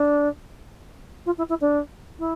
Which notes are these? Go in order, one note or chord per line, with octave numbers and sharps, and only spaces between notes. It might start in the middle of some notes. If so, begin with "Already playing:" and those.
Already playing: D4
F4
E4
E4
D4
E4